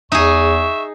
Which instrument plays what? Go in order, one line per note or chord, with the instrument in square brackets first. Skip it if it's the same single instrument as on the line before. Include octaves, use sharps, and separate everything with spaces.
[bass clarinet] E2 [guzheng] D#4 G#4 [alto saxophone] E5 [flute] C#6